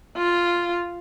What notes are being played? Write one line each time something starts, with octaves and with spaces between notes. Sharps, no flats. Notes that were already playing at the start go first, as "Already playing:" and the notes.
F4